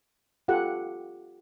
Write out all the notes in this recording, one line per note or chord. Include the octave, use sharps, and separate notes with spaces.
F4 G4 A4 F#5